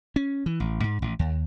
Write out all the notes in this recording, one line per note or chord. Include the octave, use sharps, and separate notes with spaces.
C#4
E3
A1
G#2
A1
D#2